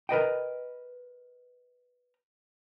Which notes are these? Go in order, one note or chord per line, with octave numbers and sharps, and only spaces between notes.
A#4 B4 D#5 G5